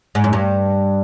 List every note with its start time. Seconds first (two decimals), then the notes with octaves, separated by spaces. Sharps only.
0.15 G#2
0.24 F#2
0.33 G2